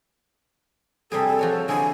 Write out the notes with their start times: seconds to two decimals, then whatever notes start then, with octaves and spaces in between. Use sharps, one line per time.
1.12 C3 G3 G#4 A4
1.27 A4
1.39 F3 F#4 C#5
1.68 D3 G#3 E4 G#5